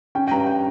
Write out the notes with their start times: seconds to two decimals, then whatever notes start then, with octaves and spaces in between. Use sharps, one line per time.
0.15 C#4 G5
0.27 G5
0.31 G2 A#5
0.47 G5